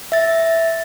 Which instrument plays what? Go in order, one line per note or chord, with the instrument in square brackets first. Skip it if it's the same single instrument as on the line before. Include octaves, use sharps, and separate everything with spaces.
[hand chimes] E5 A6